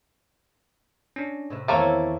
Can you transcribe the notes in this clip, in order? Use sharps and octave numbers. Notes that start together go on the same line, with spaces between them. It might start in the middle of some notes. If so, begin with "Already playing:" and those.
C#4 D4
A2 C3 E5
E2 D#3 A3 A#3 C4 E4 C#5 A6